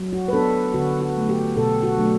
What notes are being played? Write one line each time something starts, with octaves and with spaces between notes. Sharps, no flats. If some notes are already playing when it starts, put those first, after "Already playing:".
Already playing: F#3
F#4
B4
B3 D4 A4
D3 F#4
F#4
F#3 A3
G4
B2 A4
F#4
F#3 A3 D4